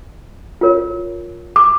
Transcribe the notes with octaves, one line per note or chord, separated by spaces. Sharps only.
F4 A#4 C#5
D6